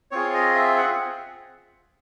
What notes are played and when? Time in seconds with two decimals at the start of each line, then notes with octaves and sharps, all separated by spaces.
0.11 C4 F4 G#4 C#5
0.34 D#5
0.55 E5
0.77 F#5